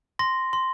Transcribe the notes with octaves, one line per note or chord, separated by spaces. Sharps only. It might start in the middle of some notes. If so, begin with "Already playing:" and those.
C6 A#6
C6